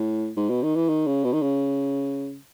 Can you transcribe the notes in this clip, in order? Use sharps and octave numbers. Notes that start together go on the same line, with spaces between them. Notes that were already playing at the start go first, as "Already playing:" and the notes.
Already playing: A2
G#2
B2
D#3
E3
D#3
C#3
B2
D#3
C#3